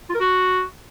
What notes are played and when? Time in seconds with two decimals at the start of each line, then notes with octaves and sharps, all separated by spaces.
0.10 F4
0.15 A#4
0.20 F#4